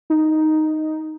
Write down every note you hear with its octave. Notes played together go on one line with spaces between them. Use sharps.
D#4